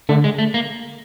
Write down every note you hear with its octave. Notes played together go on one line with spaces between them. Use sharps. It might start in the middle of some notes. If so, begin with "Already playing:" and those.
D3 A3
G#3
A3
A#3